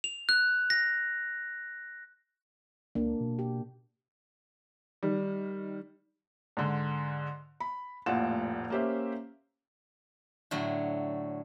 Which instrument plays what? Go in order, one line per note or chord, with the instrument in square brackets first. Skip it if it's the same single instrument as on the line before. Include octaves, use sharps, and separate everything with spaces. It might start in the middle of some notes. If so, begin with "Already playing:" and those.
[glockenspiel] F7
F#6
A#6
[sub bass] C#2 [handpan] A#3 D4
[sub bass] B2
[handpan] G4
[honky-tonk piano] D#3 G3
[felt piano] G#2 D3
B5
F1 A#1 A2 F4 F#5 E7
A#3 C#4 G4 C5 E5
[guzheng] A2 D3 F#3